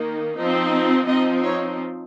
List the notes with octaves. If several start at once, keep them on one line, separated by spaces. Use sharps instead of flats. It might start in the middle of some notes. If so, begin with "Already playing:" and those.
Already playing: D#3 A#3 D#4
F3 C4 D#4
F3 C4 D#4 D#5
C#5